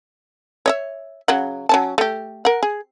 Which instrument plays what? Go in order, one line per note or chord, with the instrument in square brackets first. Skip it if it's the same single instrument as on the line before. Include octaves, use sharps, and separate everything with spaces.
[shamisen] C#5 D#5 E5
C#3 F#3 F#5
F#3 C#4 A5
A3 G4
A#4 F#5
G#4